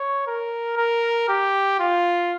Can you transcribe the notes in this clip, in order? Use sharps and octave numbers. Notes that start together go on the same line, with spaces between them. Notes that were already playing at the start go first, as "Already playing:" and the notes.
Already playing: C#5
A#4
A#4
G4
F4